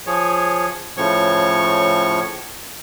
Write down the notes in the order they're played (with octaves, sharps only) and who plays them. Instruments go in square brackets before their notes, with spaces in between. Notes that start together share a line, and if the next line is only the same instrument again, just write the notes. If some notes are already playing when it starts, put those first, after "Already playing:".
[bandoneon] F3 G#4 C#5
A2 C#3 F3 C#5 C#6